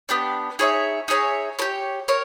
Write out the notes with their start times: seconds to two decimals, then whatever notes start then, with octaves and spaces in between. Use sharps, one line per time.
0.09 B3 D4 G4
0.59 D#4 G#4 C#5 E5
1.08 D#4 G#4 C#5 E5
1.59 G4 A#4 C#5
2.08 A#4 C#5